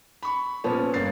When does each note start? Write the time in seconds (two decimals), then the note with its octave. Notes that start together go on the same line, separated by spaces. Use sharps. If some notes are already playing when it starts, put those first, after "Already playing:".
0.23 B5 C#6
0.64 A#2 F3 B3 C#4
0.94 G1 A#3 A6 C7